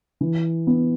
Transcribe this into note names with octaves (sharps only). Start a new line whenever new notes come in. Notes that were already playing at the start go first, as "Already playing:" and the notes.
E3
B3